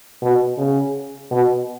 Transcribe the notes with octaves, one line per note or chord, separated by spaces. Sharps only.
B2
C#3
B2